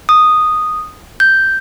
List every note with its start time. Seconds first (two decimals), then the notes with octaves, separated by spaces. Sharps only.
0.09 D#6
1.20 G6